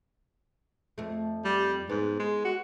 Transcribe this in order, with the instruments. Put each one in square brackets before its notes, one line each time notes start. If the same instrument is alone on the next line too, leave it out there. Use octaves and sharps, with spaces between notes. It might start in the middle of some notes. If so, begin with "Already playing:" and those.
[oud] F2 A3
[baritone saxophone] G3
[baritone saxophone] G#2 [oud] B3
[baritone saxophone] G#3
F#4